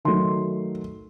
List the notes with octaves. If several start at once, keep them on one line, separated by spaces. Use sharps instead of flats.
D#3 F#3 A3 C6